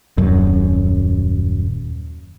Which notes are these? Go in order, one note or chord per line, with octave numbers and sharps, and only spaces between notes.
D#1 F#2